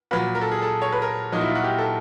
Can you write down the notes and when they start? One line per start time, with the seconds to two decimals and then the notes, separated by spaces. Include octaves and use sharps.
0.11 A#2 F#3 B4
0.35 A#4
0.41 A4
0.51 G#4
0.62 A4
0.82 C#5
0.92 B4
1.02 A#4
1.32 A#2 F#3 D#4
1.41 E4
1.49 F4
1.55 F#4
1.64 G4
1.78 A4